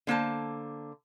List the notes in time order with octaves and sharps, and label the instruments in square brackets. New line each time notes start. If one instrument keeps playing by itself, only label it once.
[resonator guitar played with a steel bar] D3 A#3 C5 A5